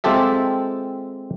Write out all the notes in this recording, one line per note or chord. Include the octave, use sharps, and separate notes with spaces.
G#3 C4 F4 G4 A4 E5